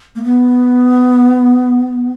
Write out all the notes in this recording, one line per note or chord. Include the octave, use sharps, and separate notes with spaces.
A#3
B3